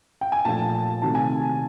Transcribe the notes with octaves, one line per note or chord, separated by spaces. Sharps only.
G5
G#5
A#2 F3 A3 D4 A5
C3 D#3 F#3 A3 A5
G#5